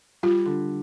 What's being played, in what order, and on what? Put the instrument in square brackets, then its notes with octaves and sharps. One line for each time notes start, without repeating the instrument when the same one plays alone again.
[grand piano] G3 [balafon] F4
[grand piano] D3